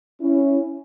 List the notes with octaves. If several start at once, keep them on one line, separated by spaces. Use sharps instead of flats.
C#4 E4